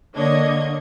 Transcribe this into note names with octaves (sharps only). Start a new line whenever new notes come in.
D3 A#3 D4 C#5 D#5 G#6